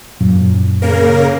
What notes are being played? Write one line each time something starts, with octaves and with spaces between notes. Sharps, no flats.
F#2 A#2 F#3
C#3 A#3 A#4